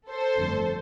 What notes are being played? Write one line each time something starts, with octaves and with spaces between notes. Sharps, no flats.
A4 C5
G1 F2 D3 A3